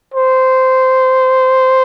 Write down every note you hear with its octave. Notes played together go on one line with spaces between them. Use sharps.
C5